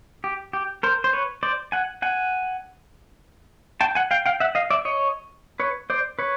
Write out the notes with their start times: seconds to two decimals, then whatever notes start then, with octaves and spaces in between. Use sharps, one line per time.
0.24 G4
0.53 G4
0.83 A#4 C5
1.04 C5
1.13 B4 C#5
1.43 C5 D5
1.72 F#5 G#5
2.02 F#5 G#5
3.81 G5 A5
3.95 F#5 G#5
4.11 F5 G5
4.26 F5 G5
4.40 E5 F#5
4.55 D#5 F5
4.70 D5 E5
4.85 C#5 D#5
5.60 B4 C#5
5.90 C5 D5
6.19 B4 C#5